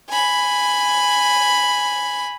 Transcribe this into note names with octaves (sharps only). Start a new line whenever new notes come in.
G#5 B5